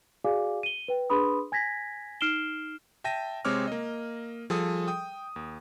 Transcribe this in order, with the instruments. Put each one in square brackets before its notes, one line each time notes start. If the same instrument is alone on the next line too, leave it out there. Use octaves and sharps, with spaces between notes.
[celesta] F#4 G#4 D5 F5 G#5 D6
D#7 G7
B4 G5
D4 G#4 B4 B5 C6 D#6
G#5 G#6 A#6 B6
D#4 F6 C7 D7 E7 G7
[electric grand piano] E5 G5 A5 A#6 D#7
C3 G#3 C4 C#5 D6 F6
A#3 D#5
F3 G3 G#4 A4 G#5 D#6
G5 D#6
D#2